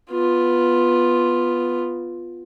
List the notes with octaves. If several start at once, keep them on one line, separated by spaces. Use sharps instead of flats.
B3 F4